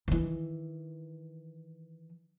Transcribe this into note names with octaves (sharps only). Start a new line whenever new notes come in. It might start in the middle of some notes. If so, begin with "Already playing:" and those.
D#3 E3